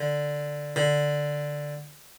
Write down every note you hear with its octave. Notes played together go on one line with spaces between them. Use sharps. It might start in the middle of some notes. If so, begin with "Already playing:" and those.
Already playing: D3
D3